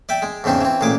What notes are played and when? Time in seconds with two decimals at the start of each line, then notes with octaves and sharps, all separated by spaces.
0.09 D5 E5 G5
0.22 G#3
0.44 E2 G#2 C#3 C4 D4
0.61 E3 C4
0.81 A1 A#2 G#4 D6